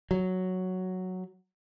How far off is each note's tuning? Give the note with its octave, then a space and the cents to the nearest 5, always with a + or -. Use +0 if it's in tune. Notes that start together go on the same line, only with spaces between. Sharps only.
F#3 +0